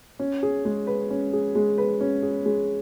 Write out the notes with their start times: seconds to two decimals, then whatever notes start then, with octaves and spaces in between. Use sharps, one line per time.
0.19 C#4
0.43 G#4
0.65 G#3
0.87 B4
1.10 C#4
1.33 G#4
1.55 G#3
1.78 B4
2.01 C#4
2.23 G#4
2.46 G#3